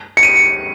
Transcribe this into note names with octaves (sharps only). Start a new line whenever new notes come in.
C#7
D#7